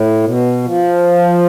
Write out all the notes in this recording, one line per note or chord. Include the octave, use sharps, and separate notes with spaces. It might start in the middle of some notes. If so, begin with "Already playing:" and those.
Already playing: A2
B2
F3